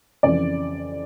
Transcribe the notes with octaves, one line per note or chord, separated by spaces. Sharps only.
F2 C#3 E3 D5